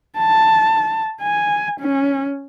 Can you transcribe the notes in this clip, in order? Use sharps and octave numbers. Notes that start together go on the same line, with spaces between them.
A5
G#5
C#4